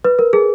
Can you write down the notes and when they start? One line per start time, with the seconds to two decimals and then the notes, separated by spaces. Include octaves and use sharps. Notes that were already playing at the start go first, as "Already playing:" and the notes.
0.05 B4
0.19 A#4
0.33 G#4